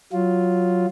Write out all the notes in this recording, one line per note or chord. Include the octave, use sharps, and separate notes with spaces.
F#3 F4